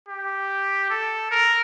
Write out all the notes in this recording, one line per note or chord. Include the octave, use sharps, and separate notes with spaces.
G4
A4
A#4